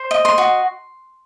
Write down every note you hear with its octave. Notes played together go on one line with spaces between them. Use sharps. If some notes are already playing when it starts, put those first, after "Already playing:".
Already playing: C5
D#5
C6
F#4